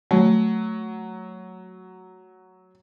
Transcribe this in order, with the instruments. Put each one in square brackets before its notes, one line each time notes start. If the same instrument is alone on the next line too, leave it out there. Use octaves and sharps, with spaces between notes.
[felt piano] F#3 [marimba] A3